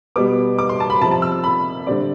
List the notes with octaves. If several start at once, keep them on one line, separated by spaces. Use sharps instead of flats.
B2 G3 B3 D6
D6
C6
A5
B5
C3 F3 C4 A5
A5
E6
B5
D3 G3 C4 D5